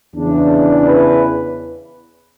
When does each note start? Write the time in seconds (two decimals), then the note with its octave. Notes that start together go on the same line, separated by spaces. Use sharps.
0.15 E2 C#3 E3 D4
0.87 B4